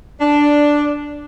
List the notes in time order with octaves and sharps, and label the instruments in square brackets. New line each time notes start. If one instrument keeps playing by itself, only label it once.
[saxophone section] D4